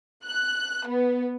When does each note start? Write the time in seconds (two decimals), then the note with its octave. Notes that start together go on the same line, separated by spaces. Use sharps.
0.24 F#6
0.87 B3